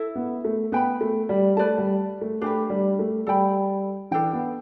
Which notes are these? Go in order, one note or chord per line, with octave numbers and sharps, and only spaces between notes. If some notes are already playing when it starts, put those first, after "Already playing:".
Already playing: E4 A4 E5
B3
A3
B3 B4 G5 B5
A3
G3
A3 B4 D5 A5
G3
A3
A3 D4 G4 B4
G3
A3
G3 A4 G5 B5
E3 D4 A4 G5
B3